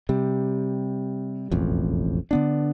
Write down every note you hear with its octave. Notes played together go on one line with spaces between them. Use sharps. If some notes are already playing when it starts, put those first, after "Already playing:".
C3 G3
E1 A1 F2
D3 B3 D4